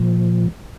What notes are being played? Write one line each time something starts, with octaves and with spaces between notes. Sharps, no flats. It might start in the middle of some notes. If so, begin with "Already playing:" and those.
Already playing: A#2 F3